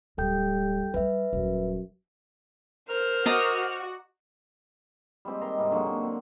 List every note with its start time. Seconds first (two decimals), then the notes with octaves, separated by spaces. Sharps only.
0.18 D1 G3 A4 G5 G6
0.94 F#3 G3 B4 E5
1.33 D#1 F#2
2.89 A#4 C5 F6
3.26 F#4 D5 D#5 A#5
5.25 G3 G#3 C4 G4
5.41 D#3 D#4 A#5 C6
5.58 G#2 C3 G3
5.71 D3 F#3 G#3 A#3
5.86 D3
6.03 C4